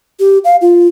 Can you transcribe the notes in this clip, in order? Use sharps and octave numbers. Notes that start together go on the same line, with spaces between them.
G4
F5
F4